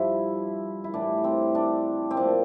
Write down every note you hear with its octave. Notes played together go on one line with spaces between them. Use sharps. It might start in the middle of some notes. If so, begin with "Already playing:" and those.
Already playing: G2 F3 E4
E4
A2 E3 G3 D4
C4
D4
C4
A#2 F3 D4